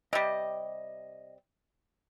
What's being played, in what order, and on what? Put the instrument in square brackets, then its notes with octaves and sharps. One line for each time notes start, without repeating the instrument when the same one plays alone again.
[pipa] C3 G3 [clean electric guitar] D#5